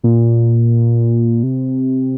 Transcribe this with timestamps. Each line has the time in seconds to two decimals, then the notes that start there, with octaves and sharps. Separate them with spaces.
0.04 A#2
1.43 C3